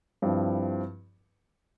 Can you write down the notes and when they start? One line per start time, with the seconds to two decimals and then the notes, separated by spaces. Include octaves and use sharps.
0.22 G2 F3 C4 E4